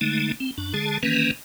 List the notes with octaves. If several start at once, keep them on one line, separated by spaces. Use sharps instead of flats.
D3 G#3 A3 D#4
C4
F#2 D4
D3 G#3 G#4 A5
D#3 E3 A#3 C#4 B4